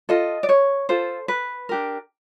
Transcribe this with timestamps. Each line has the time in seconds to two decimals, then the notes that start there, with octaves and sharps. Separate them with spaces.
0.09 F4 A4 D#5
0.43 D5
0.49 C#5
0.89 F4 A4 C5
1.28 B4
1.69 D4 G4 A#4